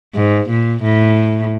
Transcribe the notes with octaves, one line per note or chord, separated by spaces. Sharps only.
G#2
A#2
A2